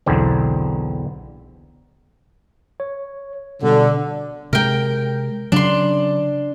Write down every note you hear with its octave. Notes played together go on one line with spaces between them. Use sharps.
B1 E2 D3 C4
C#5
B2 D3 G3
C3 G#3 A#4 G5
C#3 F#3 D4 C6